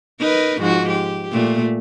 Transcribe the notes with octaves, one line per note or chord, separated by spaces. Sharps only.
D#4 A#4 B4
G#2 F3 F#4
G4
A#2 A3